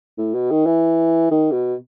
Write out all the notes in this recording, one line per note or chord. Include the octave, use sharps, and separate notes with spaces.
A2
B2
D#3
E3
D#3
B2